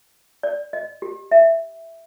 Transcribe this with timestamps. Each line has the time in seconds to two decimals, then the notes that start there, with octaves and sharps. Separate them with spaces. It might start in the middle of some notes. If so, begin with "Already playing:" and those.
0.43 D5
0.73 D#5
1.02 G4
1.31 E5